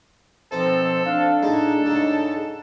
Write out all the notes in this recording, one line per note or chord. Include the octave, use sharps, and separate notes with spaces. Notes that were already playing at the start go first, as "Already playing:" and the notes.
B2 F3 C4 D#4 A4 C5
D4 F5
A2 G#3 D#4 A4
G#2 C#3 D#4